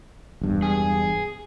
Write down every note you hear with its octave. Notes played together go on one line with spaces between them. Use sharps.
E1 G2
G#4